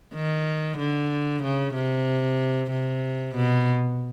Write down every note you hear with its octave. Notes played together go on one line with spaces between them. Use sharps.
D#3
D3
C#3
C3
C3
B2